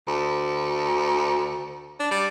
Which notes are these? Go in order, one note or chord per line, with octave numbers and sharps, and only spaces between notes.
D2
D4
G3